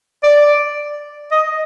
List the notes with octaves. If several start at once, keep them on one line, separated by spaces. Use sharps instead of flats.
D5
D#5